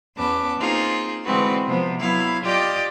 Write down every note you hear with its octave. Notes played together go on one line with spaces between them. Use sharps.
E2 B3 C#4 B4 A5 D6
A#3 C4 D#4 F4 G#4
D3 E3 G#3 C4 F#4 B4
C3 F3 B3
F#3 B3 E4 F5
F4 G4 D5 D#5 G5